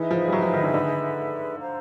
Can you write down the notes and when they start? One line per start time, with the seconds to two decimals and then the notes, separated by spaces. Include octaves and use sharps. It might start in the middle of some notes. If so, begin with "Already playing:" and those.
Already playing: E3 D#4 G#4 B4 E5
0.11 F3
0.28 G3
0.32 F#3
0.42 F3
0.54 D#3
0.63 D3
0.74 D3
1.59 C5 F5 A#5